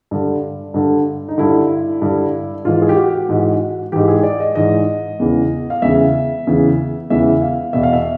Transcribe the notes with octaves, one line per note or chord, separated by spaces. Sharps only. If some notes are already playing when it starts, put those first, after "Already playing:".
G2 D3
G2 D3
D#4
G2 D3 E4
G2 D3
G#2 E3 F4
G#4
G4
F#4
G#2 E3
G#2 E3 G4
G#4
D5
D#5
G#2 E3 D#5
E2 C#3 E3
F5
E2 C#3 E3 E5
E2 C#3 E3
E2 C#3 E3 E5
F5
E2 B2 E5
F5
E5